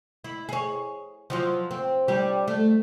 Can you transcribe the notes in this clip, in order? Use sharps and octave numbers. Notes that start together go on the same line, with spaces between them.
E4
G#4 C#5
F3 F#3 F4
C4
G3 D4 G4
A3